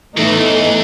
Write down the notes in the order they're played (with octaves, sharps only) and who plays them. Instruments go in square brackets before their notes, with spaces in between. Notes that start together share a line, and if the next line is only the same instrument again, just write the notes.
[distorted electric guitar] E2 [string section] A2 E3 A3 D#4